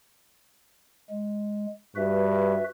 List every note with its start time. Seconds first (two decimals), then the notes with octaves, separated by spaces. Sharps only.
1.10 G#3
1.96 G2 F#4 B4 E5